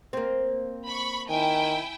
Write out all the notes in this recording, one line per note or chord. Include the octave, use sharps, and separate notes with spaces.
A#3 C4
B5 C#6
D#3 E4 G5 G#5